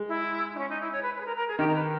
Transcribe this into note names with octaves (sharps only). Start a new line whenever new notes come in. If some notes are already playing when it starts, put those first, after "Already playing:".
Already playing: G#3
E4
D#4
C#4
D#4
E4
C#5
B4
B4
G#4
A#4
A#4
G#4
D#3 G4
A#4
B4